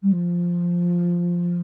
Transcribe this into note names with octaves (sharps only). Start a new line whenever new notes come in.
G3
F3